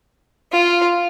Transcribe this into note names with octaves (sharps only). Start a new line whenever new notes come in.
F4